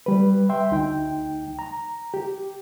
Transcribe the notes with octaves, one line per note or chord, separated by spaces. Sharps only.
G3 B4
E5 G5 C6
D2 D#4 G5
A#5
G4